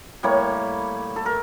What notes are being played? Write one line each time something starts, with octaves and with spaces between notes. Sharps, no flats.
A2 G3 A#3 C#5
A4
A#4